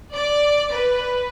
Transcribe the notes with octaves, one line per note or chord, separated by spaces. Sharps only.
D5
B4